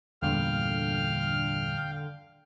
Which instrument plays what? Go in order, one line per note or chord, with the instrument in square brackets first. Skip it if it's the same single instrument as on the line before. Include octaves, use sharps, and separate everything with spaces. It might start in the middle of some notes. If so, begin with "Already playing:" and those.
[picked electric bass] E2 G2 A#2 [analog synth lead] D3 [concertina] F5 G5 [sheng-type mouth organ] F6